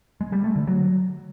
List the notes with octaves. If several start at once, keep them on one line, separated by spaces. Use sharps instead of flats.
G#3
G3
A3
D3
F#3